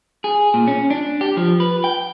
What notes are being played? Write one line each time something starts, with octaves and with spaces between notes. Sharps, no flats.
G#4
A#2
C#4
D4
G4
F3
B4
G5